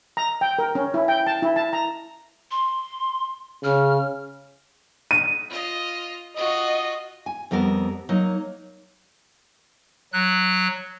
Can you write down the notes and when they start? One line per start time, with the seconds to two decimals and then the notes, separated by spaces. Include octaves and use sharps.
0.17 A#5
0.41 G5
0.59 A#4
0.75 C#4
0.94 E4
1.08 G5
1.27 A5
1.42 E4
1.56 A5
1.73 A#5
2.51 C6
3.64 C#3 F6
5.11 D#7
5.49 F4 D#5
6.37 F4 F#4 D#5
7.26 G#5
7.51 F2 G3 B3 A#4 A5
8.09 F#3 A#3 D#4
10.13 F#3 F#6